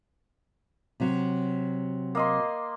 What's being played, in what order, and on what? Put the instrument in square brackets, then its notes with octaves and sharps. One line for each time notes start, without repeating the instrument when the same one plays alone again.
[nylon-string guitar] C3 F#3
[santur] A#3 D#5 C6